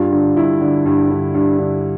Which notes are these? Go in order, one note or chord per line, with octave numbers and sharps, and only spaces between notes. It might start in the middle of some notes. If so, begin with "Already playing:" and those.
Already playing: G2 F4
D3
G2 E4
D3
G2
D3
G2
D3